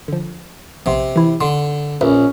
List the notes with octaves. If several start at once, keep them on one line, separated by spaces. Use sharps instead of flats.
D3 F3
A#1 C3 B3 C6
E3 E4
D3 C6
A#1 C#4 A#4 B4 E5